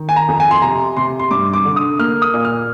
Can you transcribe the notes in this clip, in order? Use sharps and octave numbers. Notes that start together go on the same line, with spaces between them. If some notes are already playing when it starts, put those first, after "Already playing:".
Already playing: D#3
G#5
A#5
F2
G#5
C6
C3 A#5
C3 C6
C6
G2 D6
D6
D3
D#6
A#3 F6
D#6
A#2
F6